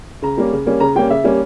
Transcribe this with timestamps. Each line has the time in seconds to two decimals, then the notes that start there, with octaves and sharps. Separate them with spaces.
0.22 C#3 A#5
0.37 G3 A#3 C#4
0.52 C#3
0.66 G3 A#3 C#4
0.80 C#3 A#5
0.95 G3 A#3 C#4 G5
1.10 C#3 E5
1.24 G3 A#3 C#4